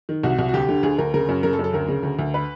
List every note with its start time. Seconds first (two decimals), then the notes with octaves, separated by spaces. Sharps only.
0.09 D#3
0.24 C2 F#4
0.39 C2
0.49 F#4
0.54 D2 G4
0.69 D3
0.83 D2 G#4
0.98 D2 A#4
1.14 C#3 A#4
1.29 F#2
1.43 C#3 A#4
1.53 A4
1.59 F#2
1.64 A4
1.73 D2 A#4
1.89 C#3
2.03 D2
2.19 D2
2.34 B4